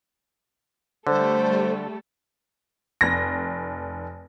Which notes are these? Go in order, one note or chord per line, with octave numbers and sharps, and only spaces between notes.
D3 G3 A3 A4 C5
F1 A#6